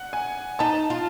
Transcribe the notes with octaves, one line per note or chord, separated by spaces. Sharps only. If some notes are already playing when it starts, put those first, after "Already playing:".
Already playing: F#5
G#5
D#4 A5
F4